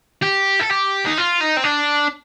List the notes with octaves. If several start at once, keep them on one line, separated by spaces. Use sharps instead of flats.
G4
A4
G4
D#4
F4
D#4
C4
D4